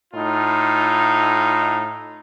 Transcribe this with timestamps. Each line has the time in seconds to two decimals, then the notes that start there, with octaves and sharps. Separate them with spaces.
0.14 A2 D#4 F4